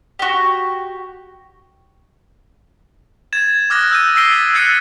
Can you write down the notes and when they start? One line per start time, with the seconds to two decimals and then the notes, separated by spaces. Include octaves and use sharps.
0.19 F#4 G4
3.33 G#6 A6 E7
3.70 D6 D#6 F6 F#6 A6 A#6
3.91 E6 G6 D#7
4.15 E6 A6 B6 C7 D7 G7
4.54 E6 F#6 G6 A6 C#7 D#7